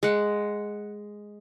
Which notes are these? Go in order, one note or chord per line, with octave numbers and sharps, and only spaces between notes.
G#3 F#5